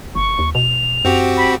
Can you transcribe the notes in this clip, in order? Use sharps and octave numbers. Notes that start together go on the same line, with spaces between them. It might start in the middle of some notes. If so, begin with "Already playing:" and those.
G1 C#6
D#2
B2 F7
F#2 C4 F#4 G4
B5